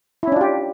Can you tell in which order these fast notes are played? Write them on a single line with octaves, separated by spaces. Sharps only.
E4 C#4 D4 F4 G4